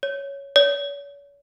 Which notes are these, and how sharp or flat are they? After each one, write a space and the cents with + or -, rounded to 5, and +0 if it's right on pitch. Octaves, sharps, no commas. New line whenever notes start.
C#5 +5
C#5 +40